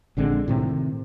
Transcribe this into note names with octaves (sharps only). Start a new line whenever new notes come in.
A#1 D3 G#3 C4
A2 C3 D#3